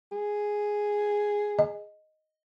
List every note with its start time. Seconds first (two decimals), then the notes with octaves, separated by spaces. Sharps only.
0.12 G#4
1.59 D#5